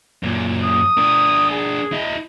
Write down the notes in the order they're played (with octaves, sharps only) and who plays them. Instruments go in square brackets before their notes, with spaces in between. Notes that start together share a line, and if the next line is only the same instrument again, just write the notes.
[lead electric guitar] F#2 A#2
[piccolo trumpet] D#6
[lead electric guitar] D4 A#4
[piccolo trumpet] G#4
[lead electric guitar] E4 D#5